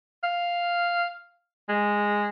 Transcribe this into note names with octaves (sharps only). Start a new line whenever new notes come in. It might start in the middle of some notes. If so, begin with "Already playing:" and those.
F5
G#3